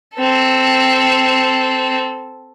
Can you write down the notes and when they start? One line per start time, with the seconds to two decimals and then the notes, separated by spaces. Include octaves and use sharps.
0.17 C4 A4